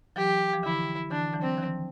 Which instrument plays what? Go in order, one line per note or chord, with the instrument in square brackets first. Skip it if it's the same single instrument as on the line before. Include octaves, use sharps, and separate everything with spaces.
[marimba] E3 F#3 [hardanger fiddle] G4
[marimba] F3
[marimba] D3 E3 [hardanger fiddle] E4
[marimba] D3 E3 [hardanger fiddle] D4
[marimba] E3 F#3
[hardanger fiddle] C4
[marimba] D#3 F3